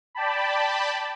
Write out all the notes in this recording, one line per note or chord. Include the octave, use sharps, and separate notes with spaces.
D5 G5 A5 B5